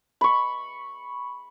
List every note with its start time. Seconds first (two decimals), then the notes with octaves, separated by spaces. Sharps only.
0.21 B5 C#6